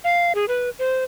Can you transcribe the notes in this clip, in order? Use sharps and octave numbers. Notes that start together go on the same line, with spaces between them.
F5
G#4
B4
C5